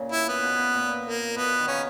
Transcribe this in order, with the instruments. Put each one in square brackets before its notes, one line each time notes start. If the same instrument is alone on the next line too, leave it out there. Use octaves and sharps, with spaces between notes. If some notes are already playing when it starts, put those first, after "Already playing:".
Already playing: [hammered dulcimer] A#2 C#3
[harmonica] E4
B3
[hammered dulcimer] B2
B2
A#2
[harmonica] A#3
[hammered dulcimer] B2 [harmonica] B3
[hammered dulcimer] D#3
[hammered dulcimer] C#3 [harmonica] C#4